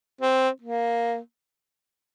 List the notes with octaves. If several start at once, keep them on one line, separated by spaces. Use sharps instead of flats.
C4
A#3